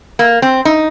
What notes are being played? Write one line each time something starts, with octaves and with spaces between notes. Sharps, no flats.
A#3
C4
D#4